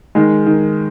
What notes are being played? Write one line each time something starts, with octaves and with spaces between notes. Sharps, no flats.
D#3 G#3
D#3